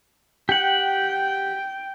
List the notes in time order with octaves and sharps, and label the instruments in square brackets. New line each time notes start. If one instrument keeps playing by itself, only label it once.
[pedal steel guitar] G4 F#5 [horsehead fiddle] G5